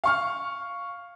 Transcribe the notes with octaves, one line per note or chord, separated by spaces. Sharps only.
F5 C#6 F6